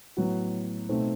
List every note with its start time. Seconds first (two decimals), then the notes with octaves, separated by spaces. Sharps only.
0.17 A2 F#3 B3 F#4
0.89 B2 A3 C4 D#4